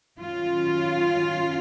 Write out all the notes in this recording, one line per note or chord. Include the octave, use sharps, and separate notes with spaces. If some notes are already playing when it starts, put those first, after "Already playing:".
D#3 F#3 C#4 F4